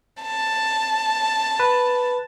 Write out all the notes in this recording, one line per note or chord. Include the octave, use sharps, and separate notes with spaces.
A5
B4